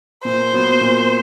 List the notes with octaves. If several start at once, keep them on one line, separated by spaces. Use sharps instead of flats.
A#2 C5
F#3 B3
A#2